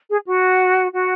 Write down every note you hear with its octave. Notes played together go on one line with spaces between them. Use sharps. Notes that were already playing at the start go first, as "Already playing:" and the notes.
G#4
F#4
F#4